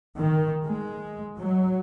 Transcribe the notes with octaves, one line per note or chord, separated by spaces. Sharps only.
D#3
G#3
F#3